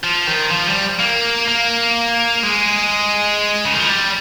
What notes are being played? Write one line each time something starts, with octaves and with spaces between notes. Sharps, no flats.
F3
D#3
F3
G3
A#3
A#3
G#3
C#3
D#3
F3
G3